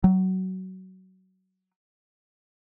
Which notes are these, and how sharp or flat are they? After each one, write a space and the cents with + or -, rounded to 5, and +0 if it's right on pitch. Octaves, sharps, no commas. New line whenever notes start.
F#3 +20